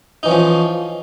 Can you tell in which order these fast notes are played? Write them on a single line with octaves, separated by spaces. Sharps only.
D#4 E3 C#4 F3